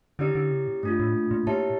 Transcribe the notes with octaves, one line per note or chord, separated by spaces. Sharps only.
D3 C#4 E4 G4 D5
D3
C#3
A#2
G2 A3 D4 F4
A2
A#2
A#2
A#2 E4 G4 C#5 E5 A5